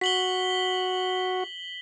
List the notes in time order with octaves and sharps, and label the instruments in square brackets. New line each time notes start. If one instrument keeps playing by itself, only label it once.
[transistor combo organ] F#4 [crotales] B6 F#7 G7